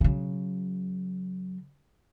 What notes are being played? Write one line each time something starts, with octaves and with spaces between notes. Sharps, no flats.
C#3 F#3